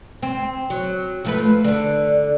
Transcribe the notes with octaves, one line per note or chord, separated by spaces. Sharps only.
C4
F#3
F3 A3 B4
D3 D4